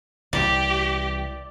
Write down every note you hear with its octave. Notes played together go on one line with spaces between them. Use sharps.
C2 E3 G4 D5